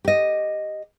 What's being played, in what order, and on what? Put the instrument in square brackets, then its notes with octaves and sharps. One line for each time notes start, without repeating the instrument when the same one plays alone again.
[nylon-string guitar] G4 D#5